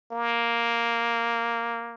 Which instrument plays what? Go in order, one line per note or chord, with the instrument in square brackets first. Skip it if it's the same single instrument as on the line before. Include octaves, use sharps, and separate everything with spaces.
[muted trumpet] A#3